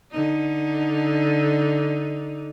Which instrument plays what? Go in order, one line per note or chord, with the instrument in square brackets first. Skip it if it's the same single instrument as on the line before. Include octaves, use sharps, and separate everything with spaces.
[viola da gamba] D3 D#4